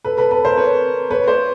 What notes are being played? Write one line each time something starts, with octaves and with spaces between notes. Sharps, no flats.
A4 B4
A4 B4
A4 B4
A#4 C5
B4 C#5
B4 C#5
C5 D5